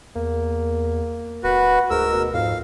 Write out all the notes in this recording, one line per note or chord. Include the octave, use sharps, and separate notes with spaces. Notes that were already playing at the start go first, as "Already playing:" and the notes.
E2 A#3
D1 F#4 B4
D2 G#2 A#4 E6
B2
F2 G#2 F5